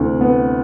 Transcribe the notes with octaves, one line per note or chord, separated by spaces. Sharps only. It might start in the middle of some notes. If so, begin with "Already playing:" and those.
Already playing: D2 C3 E3
B3